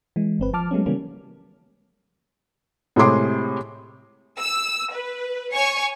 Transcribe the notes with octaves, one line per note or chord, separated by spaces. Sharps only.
E3 G#3
G1 C4 B4
F3 A5 D6 F6
F#3 G#3 A3 B3 C#4
C#3 E3 G3 A#3 B3 C#4
A2 C3 G#3 G#4 C6 D6
E6
B4
C#5 G#5 C#6